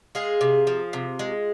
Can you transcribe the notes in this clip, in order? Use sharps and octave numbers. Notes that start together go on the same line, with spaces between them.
G#3 F4 G#4
C3
F3
C3
G#3